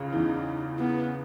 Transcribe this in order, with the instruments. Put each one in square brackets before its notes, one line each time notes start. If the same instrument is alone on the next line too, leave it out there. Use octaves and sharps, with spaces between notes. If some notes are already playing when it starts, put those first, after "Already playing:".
Already playing: [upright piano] C#2 C#3
[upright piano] E2 E3 [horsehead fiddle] D#4
[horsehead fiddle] B3